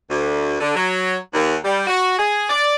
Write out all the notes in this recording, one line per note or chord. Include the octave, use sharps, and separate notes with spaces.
D2
D3
F#3
D#2
G3
F#4
G#4
D5